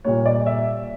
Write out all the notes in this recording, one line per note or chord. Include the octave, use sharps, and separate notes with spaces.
A#2 G3 A#3 C#5
D5
E5